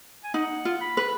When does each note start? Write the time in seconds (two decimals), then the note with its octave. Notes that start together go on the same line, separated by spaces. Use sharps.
0.24 G#5
0.34 D#4 F#5
0.65 F4
0.81 B5
0.97 B4